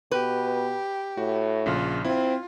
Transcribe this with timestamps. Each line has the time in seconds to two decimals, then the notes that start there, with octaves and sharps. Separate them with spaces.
0.11 B2 G4 B4
1.17 A2 F#4
1.66 A#1 C#3 F4
2.05 C4 E4 F4